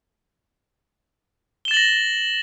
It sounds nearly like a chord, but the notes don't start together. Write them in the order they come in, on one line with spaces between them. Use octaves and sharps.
G7 E7 A6 F#7 A#6